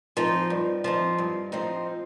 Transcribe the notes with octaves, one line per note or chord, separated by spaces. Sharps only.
F3 C4 D#4
G2
F3 C4 D#4
G2
F3 C4 D#4